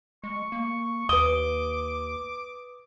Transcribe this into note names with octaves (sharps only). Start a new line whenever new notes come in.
G#3 C#6
A#3
D#2 B4 D6 D#6 G7